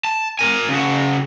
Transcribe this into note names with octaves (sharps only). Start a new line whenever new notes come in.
A5
A#4 G#5
C#3 F#4